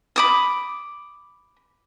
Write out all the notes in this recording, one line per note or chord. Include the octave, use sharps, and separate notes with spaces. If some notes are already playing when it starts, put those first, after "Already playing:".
B5 D6 D#6